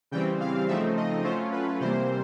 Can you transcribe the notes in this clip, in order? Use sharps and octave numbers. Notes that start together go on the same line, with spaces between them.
C#3 E3 G3 C4 G5
F5
C#3 F3 A3 C4 D#4 E5
D#5
F#3 A3 C#4 F4 C5
B4
C3 E3 G3 A#3 C5